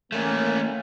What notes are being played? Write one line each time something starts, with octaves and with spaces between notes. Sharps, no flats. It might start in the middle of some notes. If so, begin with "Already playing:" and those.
A3 A#3 C#4